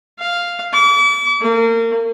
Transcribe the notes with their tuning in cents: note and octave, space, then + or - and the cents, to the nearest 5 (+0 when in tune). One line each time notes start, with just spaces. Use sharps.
F5 -5
D6 -40
A#3 -30